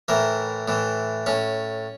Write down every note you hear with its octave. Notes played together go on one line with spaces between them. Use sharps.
A2 E3 A#4
A2 E3
A2 C#4